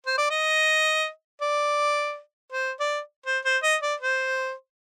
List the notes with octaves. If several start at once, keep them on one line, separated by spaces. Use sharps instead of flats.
C5
D5
D#5
D5
C5
D5
C5
C5
D#5
D5
C5